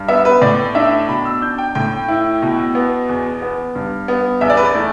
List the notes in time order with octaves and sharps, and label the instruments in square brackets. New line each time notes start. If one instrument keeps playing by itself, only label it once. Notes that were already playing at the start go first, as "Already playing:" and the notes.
Already playing: [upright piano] G2
B3 E5
B4
A2 D5
D4 E5
B2 B5
E6
D4 G6
G5
A2 G5
E4
B2
B3
E2
B3
G2
B3
E2 E5
D5
B4
D5
A3